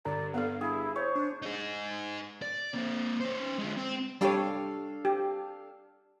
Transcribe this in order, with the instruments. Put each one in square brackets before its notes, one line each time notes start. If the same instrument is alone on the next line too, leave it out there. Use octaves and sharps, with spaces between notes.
[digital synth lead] G2 [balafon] D3 [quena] D5
[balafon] B3 A4 [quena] F5
[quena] E4 [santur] G#4
[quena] C5 [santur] C#5
[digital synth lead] D4
[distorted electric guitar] D#4 G#4
D5
A#3 C4
C#4 C5
D3 G#3
C4
[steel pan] G3 G4 C#5 [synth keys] D4 A4 F5
[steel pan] G4